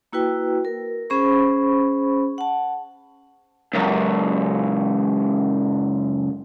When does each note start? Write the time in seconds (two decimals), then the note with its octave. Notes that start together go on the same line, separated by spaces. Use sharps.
0.13 A#3 E4 F#4 B4 G5
0.65 A#4
1.10 C#4 G#4 C5 B5 C#6
2.38 F#5 A5
3.74 C#2 F#2